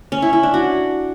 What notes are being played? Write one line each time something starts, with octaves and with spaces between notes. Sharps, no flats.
C#4
E4
E4
D4
F#4